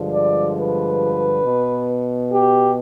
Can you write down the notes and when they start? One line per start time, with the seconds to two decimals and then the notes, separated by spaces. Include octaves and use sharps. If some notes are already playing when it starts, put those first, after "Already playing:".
Already playing: G2 D3 F3 G#3
0.12 D5
0.56 B4
1.44 B2 B3
2.32 G4